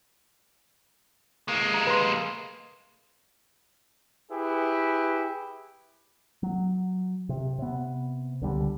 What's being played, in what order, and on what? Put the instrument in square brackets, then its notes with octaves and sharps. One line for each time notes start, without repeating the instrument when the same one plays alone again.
[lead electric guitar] G#3 A#3
[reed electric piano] A#5
B4 C6
[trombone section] E4 G4 G#4 B4
[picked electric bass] F#3
C3
C3 B3
C#2 D3 G3